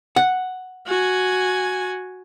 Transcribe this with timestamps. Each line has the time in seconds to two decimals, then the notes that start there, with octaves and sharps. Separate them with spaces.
0.16 F#5
0.88 F#4 G#5